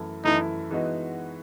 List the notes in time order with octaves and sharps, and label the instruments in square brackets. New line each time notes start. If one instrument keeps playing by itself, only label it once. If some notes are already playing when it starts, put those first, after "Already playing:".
Already playing: [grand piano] F#2 E3 A3 E4
[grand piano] F#2 E3 A3 E4 [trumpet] D#4
[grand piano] E3 G#3 B3 D#4 F#4